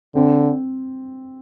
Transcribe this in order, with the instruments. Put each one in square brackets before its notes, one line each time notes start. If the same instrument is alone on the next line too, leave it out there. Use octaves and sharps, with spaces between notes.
[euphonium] D3 [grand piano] C4